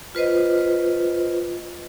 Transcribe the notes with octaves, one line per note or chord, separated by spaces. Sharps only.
F4 B4 C5 D#5